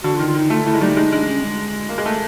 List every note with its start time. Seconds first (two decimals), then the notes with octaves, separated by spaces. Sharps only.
0.04 D3 F#4
0.16 F4
0.19 D#3
0.27 F4
0.34 D#3 D#4
0.50 A3 F4
0.65 A3 E4
0.74 G#3
0.81 G3 D#4
0.96 G#3 D#4
1.12 G#3 D4
1.28 C#4
1.43 G#3
1.89 A#3
1.98 G#3
2.06 A3